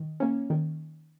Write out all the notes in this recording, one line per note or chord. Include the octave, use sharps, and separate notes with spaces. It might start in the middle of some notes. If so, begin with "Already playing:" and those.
Already playing: D#3
A#3 C#4
D#3